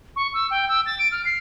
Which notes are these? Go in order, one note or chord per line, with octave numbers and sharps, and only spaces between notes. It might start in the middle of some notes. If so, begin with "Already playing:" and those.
C#6
E6
G5
E6
A6
D7
F6
C7